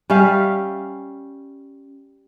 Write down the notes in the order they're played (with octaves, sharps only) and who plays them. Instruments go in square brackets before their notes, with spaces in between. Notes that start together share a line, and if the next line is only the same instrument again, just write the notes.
[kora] G3 C#4 E5 F5